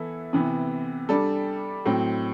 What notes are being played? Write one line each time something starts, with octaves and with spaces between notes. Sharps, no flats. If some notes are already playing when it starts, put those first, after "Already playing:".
Already playing: E3 B3 E4 A4
C3 E3 B3
G3 D4 A4
A2 F#3 C4